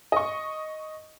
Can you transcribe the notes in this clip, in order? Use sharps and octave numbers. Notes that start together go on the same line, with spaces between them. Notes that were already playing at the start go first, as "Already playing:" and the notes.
D#5 C#6